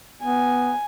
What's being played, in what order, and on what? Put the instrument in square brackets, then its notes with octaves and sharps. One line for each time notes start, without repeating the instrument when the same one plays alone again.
[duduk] B3 [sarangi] G#5